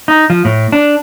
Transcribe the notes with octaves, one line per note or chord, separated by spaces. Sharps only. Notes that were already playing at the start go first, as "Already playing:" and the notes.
D#4
F3
A2
D4